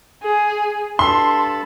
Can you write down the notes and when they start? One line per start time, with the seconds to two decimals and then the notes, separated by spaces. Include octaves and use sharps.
0.23 G#4
0.99 G2 A4 A5 B5 C6